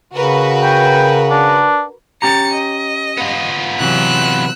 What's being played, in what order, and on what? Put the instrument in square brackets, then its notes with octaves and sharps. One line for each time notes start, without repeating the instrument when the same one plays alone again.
[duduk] C#3 [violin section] F#4 A#4 B4
[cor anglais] G5
D4
[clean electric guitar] C#4 G4 A#5 [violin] A6 C#7
[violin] D#5
[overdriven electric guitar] B3 F4
[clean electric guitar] C3 E3 F#3 [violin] E6 F#6